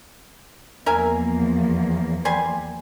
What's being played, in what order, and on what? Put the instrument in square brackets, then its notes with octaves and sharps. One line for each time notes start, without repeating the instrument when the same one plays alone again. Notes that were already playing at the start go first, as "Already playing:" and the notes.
[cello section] E2 F3 A#3 [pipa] A#4 E5 G#5
[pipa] G3 G#5 C6